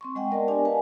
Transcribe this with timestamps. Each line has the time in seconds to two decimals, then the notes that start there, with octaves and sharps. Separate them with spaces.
0.01 C4 C6 C#6
0.15 G#3 D#5 F#5 G5
0.31 B3 A#4 D5 A5
0.48 D4 G4 A#4 D5 D#5 G#5
0.65 B4 F5 F#5 G#5 A5